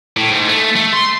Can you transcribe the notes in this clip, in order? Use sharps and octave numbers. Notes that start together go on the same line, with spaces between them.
A2
G#2
A3
A3
C6